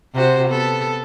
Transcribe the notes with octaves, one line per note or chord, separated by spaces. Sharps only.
C3 F#4 C5
B3 A4